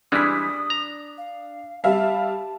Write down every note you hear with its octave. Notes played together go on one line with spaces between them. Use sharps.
E3 G3 G#3 D4 D#6 B6
A#5
F5
G3 E5 F5 A5